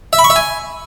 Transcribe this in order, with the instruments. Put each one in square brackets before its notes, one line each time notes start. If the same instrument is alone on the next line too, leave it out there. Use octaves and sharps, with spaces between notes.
[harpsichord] E5
B5
C#6
E5
G#5